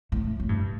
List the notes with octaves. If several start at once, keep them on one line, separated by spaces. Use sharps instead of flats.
A2
A2
G2